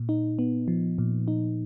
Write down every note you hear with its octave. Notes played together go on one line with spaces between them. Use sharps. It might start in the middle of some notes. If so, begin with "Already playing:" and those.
Already playing: A#2
D#4
B3
F3
A#2
D#4